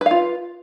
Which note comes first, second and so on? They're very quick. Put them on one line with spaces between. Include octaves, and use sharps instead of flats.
B4 F5 F4